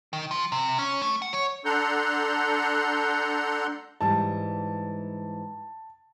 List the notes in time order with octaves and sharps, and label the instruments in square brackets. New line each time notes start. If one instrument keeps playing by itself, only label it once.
[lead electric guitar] D#3
F3
C3
C#4
A3
F#5
C#5
[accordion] D4 A4 F#5 A#5 C6 G6
[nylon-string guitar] G#2 E3 G3 [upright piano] A5